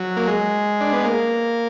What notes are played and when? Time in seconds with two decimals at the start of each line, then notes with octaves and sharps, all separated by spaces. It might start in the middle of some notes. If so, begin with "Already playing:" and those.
Already playing: F#3
0.17 A#3
0.27 G#3
0.81 D4
0.93 B3
1.04 A#3